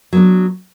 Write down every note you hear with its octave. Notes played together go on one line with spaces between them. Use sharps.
F#3 B3 D4